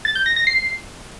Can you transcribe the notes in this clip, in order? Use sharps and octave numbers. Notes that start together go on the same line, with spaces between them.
A6
G6
A#6
A#6
C7